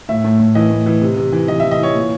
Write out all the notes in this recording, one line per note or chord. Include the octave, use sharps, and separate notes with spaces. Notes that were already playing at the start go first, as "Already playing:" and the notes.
A2 E5
A2
A2
E3 D#5
A2
E3
C3
C3
E3
E3 D#5
E5
E3
D#5
E3 C#5
A#2